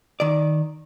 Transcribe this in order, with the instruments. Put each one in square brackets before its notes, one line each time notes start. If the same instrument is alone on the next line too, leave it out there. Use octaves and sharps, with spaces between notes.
[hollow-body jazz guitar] D#3 D5